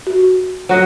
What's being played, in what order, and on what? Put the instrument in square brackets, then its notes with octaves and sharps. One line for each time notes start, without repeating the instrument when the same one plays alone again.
[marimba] F#4
[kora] F#3 F#4 D#5